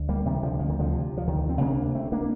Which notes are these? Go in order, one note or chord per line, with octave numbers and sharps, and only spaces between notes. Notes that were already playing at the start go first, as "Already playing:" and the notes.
Already playing: D2
G3 A#3
C3 D#3 G3
D3 F3
D2 F3
D#3
D3 F3
C3
F3
D2 D#3
C4
C3 A#3 D4
D2 A3 C4
A#3 D4